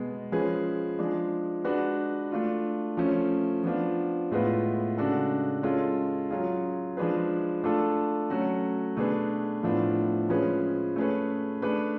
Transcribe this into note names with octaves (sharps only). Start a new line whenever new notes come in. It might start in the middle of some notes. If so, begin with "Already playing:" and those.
Already playing: B2 G#3 B3
F3 G#3 C#4 G#4 B4
F3 G#3 D4
G#3 D4 F#4 B4
A3 D4 F4
F3 A3 C#4
F3 B3 D4 F4
A2 G#3 B3 F4 B4
C#3 G#3 D4 F#4 A4
G#3 C#4 F4 A4
F#3 C#4 F4 G#4
F3 G#3 D4 G#4 B4
A3 D4 F4 A4
F#3 A3 C#4 F#4
B2 A3 D4 G#4 B4
A2 F3 B3 D4 F4
F3 G#3 C#4 G#4 B4
A3 C#4 G#4 B4
A3 D4 G#4 B4